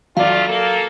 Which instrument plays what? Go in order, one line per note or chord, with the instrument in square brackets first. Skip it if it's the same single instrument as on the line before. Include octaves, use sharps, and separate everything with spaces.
[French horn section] G2 A3 F4 [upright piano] F#3 D5 [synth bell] F5
[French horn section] A#3 A4